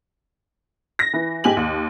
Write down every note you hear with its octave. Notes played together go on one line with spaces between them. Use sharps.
A#6
E3
G#2 G4 G#5 F#7
D#2